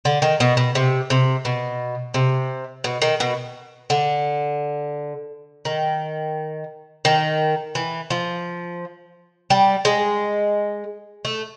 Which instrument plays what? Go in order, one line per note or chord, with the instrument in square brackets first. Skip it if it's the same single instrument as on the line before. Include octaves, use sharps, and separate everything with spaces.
[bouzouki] D3
D#3
B2
B2
C3
C3
B2
C3
B2
D#3
B2
D3
D#3
D#3
E3
F3
G3
G#3
A3